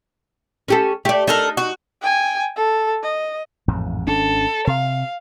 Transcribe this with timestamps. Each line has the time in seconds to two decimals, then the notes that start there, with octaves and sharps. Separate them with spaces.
0.68 C#4 G4 A4
1.05 A3 G4 D5
1.27 D4 D#4 A4 A#4
1.57 F#4
2.02 G5 G#5
2.56 A4
3.03 D#5
3.68 A1 F2 G#2
4.07 G#1 C#4 D4 A4
4.67 C3 F5